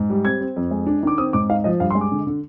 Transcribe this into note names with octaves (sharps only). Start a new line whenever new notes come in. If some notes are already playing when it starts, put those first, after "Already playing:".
Already playing: G#2
G3
C4 G#6
C4
F2
G#3
D4
D#3 D6
C4 D#6
G#2 D6
D#4 F5
F3 D#5
G2 F5
C6
G#3
D6
D3
D3